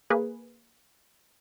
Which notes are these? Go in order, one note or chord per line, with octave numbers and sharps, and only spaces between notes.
A#3 G#4 B4